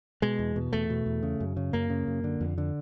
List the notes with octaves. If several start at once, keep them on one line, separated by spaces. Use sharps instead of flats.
B2 G#3
E2
B2
E2 A3
B2
E2
C#3
F#2
C#3
F#2 A#3
C#3
F#2
D3
F2
D3